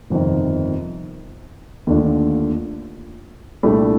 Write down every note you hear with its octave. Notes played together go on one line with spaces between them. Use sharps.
G1 F2 C3 D#3
D#2 D3 A3 D4 F4
C2 A#2 A3 D4 G4